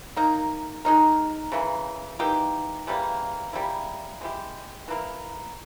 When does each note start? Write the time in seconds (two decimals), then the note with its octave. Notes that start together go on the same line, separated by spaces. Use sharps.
0.16 A#3 D#4 A#4
0.85 G#3 D#4 A#4
1.52 C#3 E3 A#3
2.19 E3 A#3 D#4 G4
2.87 C#3 E3 G3 A#3
3.53 C#3 G3 A#3 E4
4.21 G#3 B3 E4 G4
4.88 E3 A#3 E4 A#4